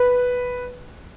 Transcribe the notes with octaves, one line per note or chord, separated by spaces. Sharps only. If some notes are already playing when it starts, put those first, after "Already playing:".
Already playing: B4